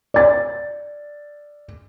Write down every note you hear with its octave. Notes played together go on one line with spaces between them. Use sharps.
D5 A6